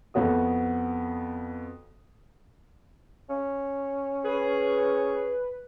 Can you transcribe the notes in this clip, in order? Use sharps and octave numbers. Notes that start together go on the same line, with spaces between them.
F2 B3 F#4 D#6
C#4
G#4 B4